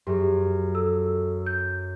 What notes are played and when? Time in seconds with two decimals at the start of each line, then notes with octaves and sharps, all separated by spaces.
0.07 F#2 G4 G#4
0.75 A4 E6
1.46 G6